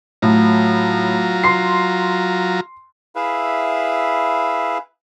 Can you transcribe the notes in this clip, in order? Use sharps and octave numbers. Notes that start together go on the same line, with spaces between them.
A2 F#3 F4 A#5
C6 C7
E4 G#4 B4 E5 F5